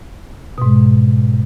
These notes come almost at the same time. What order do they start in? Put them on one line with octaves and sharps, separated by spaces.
B2 G#2 G#3